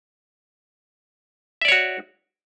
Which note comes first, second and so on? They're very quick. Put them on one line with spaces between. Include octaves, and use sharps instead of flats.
E5 D5 C#5 F#4